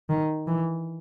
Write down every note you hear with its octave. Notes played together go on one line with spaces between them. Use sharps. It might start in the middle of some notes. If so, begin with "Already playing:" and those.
D#3
E3